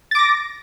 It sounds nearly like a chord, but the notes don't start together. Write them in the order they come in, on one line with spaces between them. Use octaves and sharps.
A6 D6 A#6